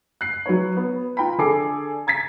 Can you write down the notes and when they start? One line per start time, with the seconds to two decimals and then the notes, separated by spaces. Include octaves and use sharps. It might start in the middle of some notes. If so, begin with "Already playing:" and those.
0.21 F#6 C7
0.46 F#3 B4 C#5
0.77 B3
1.17 F4 G5 A#5 B5
1.38 D3 G#4 A4 D6 C7
2.07 A#5 G#6 A6 B6